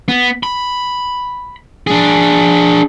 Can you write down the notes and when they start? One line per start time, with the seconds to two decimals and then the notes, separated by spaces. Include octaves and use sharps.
0.08 B3
0.43 B5
1.87 D4 G#4